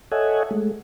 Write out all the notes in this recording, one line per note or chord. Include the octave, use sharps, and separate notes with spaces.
A4 C#5 D#5 E5 F#5 G#5
G#3 A3